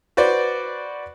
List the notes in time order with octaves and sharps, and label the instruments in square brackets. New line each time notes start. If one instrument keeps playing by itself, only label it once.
[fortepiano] F#4 B4 C5 D5